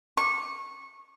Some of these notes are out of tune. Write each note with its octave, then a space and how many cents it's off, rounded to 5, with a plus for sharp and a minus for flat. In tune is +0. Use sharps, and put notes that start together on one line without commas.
C#6 -20